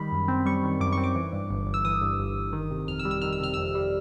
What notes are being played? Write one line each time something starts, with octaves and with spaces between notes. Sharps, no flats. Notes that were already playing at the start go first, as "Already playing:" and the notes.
Already playing: D#3 G3 B5
F#2
C4
G3 C#6
D#3
F#2 D6
C4 C#6
D6
E3
G2
G1
G1
E6
E3 D#6
G2
G1
G1
D#3
C3
F2 F6
E6
G3
E6
D#3 F6
E6
C3 F6
F2 E6
G3